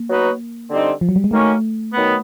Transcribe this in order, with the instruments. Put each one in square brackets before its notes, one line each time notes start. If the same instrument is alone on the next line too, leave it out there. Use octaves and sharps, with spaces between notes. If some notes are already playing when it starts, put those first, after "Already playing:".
Already playing: [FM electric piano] A#3
[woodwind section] F#3 B3 D#4 F#4 B4
D3 G3 C4 D#4
[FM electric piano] F3
F#3
G3
G#3
[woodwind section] D#3 F#3 A#3 C#4 [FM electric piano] A3
[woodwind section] D#3 F#3 B3